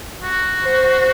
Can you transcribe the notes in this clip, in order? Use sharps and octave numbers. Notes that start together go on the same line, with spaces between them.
F#4
C5